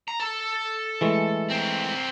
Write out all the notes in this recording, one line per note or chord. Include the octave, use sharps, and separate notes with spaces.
A#5
A4
E3 G#3 A3
C4 A#4